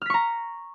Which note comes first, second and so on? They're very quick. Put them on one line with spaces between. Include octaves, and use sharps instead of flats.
F6 B6 C#6 A#5